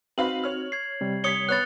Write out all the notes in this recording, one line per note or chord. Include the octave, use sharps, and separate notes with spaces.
C4 D#4 F#4 B4 F5 B5 F#7
C#5 F6
G#6 C7
C3 G3
C#5 D#6 G#6 B6 C#7 G7
B3 C#5 B5 F#6 A6